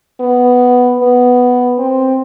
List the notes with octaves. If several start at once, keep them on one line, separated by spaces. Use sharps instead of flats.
B3
B3
C4